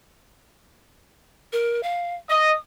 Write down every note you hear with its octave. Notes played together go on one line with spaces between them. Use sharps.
A#4
F5
D#5 D#6